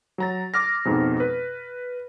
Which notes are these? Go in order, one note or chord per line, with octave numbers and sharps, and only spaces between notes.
F#3 A#5 A6
D6 F6 A#6
F2 G#2 B2
B4